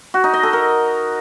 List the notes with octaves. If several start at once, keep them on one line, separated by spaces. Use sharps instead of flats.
F#4
D#4
D#5
A4
A#4